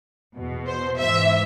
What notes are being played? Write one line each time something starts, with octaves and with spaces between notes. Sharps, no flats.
E2 B2
C5
G#2 E3 E5